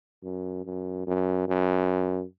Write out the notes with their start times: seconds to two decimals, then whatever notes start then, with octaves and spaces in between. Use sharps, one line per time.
0.23 F#2
0.65 F#2
1.07 F#2
1.48 F#2